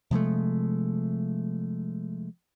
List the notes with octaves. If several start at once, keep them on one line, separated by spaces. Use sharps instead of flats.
C3 F3 G#3 A3